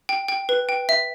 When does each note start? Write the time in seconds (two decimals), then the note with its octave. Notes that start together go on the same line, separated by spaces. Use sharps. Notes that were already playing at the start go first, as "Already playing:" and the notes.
0.09 G5
0.29 G5
0.49 B4
0.69 G5
0.89 E5